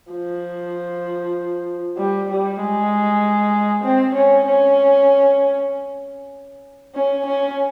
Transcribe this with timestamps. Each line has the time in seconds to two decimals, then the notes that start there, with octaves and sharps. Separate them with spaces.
0.12 F3
1.97 G3
2.29 G3
2.60 G#3
3.84 C4
4.15 C#4
4.47 C#4
6.95 C#4
7.26 C#4